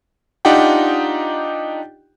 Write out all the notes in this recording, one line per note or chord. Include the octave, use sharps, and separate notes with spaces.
D4 D#4 F4 G4 F#5 G5